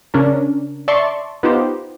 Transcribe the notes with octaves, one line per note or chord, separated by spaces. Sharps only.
C#3 C#4 D4 A#4
D5 E5 A5 C6 C#6
B3 D#4 F4 G4 C5